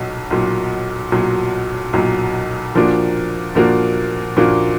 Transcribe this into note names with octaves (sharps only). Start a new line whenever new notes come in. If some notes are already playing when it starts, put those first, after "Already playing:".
Already playing: B1 A#2 F#3
B1 A#2 F#3
B1 A#2 F#3
B1 A#2 F#3
A#2 F3 A#3 D4 F#4
A#2 F3 A#3 D4 F#4
A#2 F3 A#3 D4 F#4